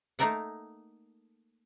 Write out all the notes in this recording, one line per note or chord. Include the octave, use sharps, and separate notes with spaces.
A3 A#3 D#4 A4 A#4 F#5